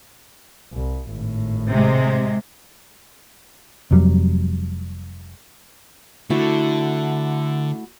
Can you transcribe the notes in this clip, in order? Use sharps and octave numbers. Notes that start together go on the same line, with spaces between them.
C2
G#1 A2
C3 G#3
F1 F2 F#3 G3
D3 A3 E4 F#4